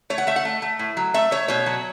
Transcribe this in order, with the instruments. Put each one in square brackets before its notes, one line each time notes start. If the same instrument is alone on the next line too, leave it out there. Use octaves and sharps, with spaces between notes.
[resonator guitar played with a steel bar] A3 C#5
F#5
A3 E5
F#5
A3
A3
A2
F#3
A3 E5
A3 C#5
B2 C#5
F#3